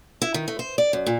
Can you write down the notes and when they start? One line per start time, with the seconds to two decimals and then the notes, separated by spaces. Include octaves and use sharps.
0.22 E4
0.34 D#3
0.48 A3
0.59 C5
0.78 D5
0.93 F#2
1.07 A#2